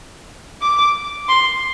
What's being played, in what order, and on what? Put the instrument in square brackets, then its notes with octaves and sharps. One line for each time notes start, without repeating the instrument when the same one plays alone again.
[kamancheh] D6
C6